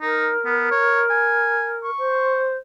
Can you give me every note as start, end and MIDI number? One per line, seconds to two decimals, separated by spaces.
0.01 0.32 63
0.01 1.90 70
0.45 0.71 59
0.71 1.03 73
1.10 1.76 80
1.84 2.46 85
1.98 2.57 72